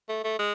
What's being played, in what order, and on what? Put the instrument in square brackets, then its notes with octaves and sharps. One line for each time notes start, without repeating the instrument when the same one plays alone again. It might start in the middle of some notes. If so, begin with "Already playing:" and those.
[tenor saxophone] A3
A3
G#3